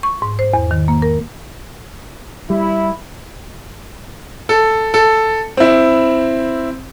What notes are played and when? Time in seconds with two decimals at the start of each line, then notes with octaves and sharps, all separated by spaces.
0.03 C#6
0.22 G#2
0.39 C5
0.54 E2
0.71 D#3
0.88 A#3
1.02 A#4
2.50 G3 E4
4.49 A4
4.94 A4
5.57 C4 E4